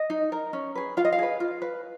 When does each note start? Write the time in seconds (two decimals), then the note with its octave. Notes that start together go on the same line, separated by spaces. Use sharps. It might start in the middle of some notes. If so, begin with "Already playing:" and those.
Already playing: D#5
0.10 D#4
0.32 A#4
0.53 C#4
0.75 G#4 B4
0.97 F4 F5
1.05 D#5
1.13 F5
1.19 G#4 B4
1.40 F4
1.62 B4